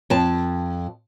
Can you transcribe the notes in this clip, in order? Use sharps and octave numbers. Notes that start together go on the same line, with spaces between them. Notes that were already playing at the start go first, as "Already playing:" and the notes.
F2 A5